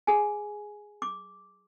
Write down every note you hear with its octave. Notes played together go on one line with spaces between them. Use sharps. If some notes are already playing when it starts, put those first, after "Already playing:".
G#4 G#5
D6